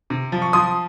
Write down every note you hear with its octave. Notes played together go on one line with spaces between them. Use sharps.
C3
F3
C#6
F3 C6 D#6